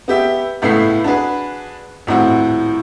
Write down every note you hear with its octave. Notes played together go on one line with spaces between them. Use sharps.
B3 G4 E5
C#2 A2 A3 B3 E5 C7
D4 F#4 G#4 B4
D#1 A2 C4 F#4